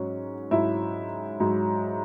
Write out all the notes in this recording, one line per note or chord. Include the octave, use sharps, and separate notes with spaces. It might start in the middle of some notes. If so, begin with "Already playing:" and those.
Already playing: G#2 F#3 C#4
G#2 F#3 E4 E5
G#2 F#3